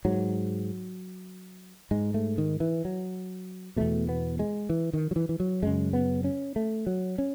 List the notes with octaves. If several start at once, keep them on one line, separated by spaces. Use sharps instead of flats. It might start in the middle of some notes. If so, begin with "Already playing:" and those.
G#2 F#3
G#2 G#3
A3
D#3
E3
F#3
E2 B2 A3
B3
G#3
E3
D#3
F#3
E3
E3
F#3
F#2 C#3 G#3
B3
C#4
A3
F#3
C#4